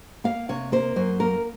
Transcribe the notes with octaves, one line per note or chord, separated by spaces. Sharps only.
A#3 F5
C3 C#5
A#3 C5
F#2 C5
A#3 A#4